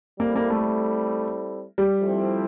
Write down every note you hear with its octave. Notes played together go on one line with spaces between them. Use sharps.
G3 A#3 C4 E4 A4
A#3
A3
G3
F3 A3 C4 E4